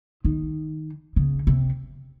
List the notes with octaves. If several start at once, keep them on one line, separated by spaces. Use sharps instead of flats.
D#3
C#3
C3